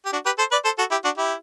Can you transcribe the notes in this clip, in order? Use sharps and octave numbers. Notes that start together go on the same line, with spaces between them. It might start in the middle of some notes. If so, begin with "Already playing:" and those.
G4
D4 F#4
G4 B4
A4 C5
B4 D5
A4 C5
F#4 A4
E4 G4
D4 F#4
E4 G4